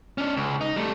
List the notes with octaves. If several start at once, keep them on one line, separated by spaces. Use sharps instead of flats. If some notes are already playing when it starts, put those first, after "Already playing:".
C#4 D4
C#2
D#4
G3 A3